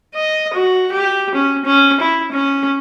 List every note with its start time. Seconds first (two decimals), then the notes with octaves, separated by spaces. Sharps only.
0.15 D#5
0.54 F#4
0.92 G4
1.35 C#4
1.65 C#4
2.00 E4
2.32 C#4